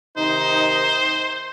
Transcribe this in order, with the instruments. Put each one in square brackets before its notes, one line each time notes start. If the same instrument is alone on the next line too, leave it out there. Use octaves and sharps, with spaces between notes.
[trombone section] C3 D#3 D#4 [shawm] C5